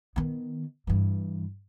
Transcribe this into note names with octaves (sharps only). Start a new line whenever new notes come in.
D#3 B3
G2 E3